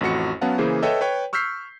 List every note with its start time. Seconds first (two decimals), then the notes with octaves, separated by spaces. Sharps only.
0.01 A1 F2 F#4 C#7
0.41 F#3 B3 C#4 F5 F#5 A5
0.58 C#3 E3 A#3 G#4 C5
0.83 A4 B4 C#5 D#5 E5 G5
1.01 B4 C#5 G5
1.33 C#6 E6 F6 G6 B6 C7